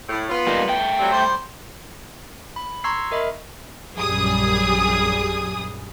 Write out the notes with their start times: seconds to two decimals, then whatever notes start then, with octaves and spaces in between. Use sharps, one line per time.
0.09 A2
0.29 B3 F4
0.47 G3 A#3 D#4
0.68 A3 G5
0.99 F#3 G3 C4
1.11 G3 C5
2.56 B5
2.84 A#5 C6 C#6 E6 G#6 C7
3.12 A#4 D#5 E5 B5
3.97 A#1 F#2 G3 G#4 D#6